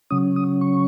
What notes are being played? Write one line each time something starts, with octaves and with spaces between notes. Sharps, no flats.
C#3 F#3 C#4 D#6
D#6
C#6